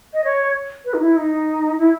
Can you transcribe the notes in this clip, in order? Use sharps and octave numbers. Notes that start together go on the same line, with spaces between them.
D#5
C#5
B4
D#4
E4
D#4
E4